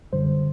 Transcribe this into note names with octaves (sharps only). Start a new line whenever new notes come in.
F#2 D3 G3 C5